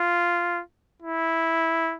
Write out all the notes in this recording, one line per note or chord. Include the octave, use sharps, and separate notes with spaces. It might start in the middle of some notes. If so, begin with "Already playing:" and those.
Already playing: F4
E4